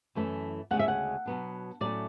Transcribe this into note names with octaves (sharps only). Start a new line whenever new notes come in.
F#2 E3 A3 C#4
D2 C#3 G#3 C#4 F#5
E5
F#5
B2 F#3 B3 D4
A2 F#3 A3 C#4 D5